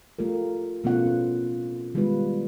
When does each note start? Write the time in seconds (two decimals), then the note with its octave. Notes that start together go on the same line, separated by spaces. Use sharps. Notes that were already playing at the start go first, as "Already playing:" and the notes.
0.19 A3 F4 G4 A#4
0.84 B2 A3 B3 C#4 F4 F#5
1.06 C4
1.94 D#3 G3 G#3 B3 F4 B4